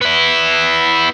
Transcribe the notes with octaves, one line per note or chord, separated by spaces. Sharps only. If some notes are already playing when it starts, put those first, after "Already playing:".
B3 E4